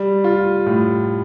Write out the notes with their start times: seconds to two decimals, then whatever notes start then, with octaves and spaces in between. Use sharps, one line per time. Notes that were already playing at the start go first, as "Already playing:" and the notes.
Already playing: G3
0.24 F4
0.66 A2